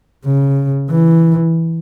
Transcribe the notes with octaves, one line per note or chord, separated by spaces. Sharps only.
C#3
E3